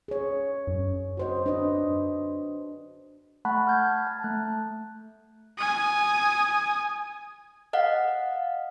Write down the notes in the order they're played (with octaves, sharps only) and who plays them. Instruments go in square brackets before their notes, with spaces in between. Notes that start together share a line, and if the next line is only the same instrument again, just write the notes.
[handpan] G#4 C#5
[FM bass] F#2
[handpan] F#4 C5 D#5
D4 B4 D#5
[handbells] A3 F#5 A5 B5 C#6 F#6
F6 G6 G#6
A5
A3 F#6
[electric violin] G#5 D#6
[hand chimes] D#5 F5 F#5